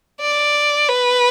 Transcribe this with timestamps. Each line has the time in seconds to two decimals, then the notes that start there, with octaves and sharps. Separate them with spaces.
0.21 D5
0.89 B4